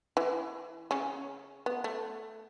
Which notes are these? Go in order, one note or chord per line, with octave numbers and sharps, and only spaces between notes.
E3 E4
C#3 C#4
B3
A3